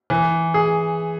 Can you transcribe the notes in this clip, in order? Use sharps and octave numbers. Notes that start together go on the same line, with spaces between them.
E3
G#4